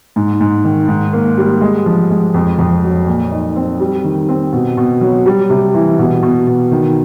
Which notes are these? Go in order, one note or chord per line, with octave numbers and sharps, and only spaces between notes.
G#2
G#2
D#3
G#2
A#3
G3
G#3
F3
G#3
F2
F2
F#3
A#2
D#4
C4
G3
D#3
C4
B2
B2
F#3
G3
C3
E3
B2
B2
B2
D#3